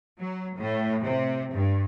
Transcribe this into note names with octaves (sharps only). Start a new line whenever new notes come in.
F#3
A2
C3
G2